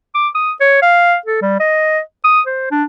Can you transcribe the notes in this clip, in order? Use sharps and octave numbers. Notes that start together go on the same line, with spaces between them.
D6
D#6
C#5
F5
A4
G3
D#5
D#6
C5
D4